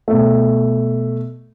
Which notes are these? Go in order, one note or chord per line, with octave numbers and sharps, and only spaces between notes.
B2 A3